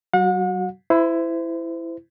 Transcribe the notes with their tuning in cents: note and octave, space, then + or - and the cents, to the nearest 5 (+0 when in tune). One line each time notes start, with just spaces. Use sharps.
F#3 +35 F#4 -5 F#5 -40
E4 +10 C5 -30